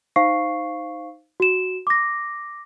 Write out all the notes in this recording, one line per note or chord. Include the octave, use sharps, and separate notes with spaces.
D#4 C5 F5 C#6 C7
F#4 E7
D6 A#6